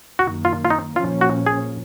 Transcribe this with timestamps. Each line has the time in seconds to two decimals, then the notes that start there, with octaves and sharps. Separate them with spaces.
0.19 F#2 D#3 A#3 F#4
0.45 F4
0.65 F4
0.70 D#4
0.96 A#2 F3 A#3 C#4 F4
1.21 F#4
1.46 G#4